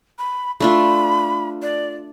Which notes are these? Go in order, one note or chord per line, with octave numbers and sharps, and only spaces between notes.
B5
A3 D4 F4 B5
D5